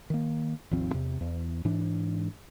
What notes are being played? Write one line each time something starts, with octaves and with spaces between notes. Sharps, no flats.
D#3 A#3
G#1 D#2 F3 C4
E2 C3
E2
G#2 E3 D4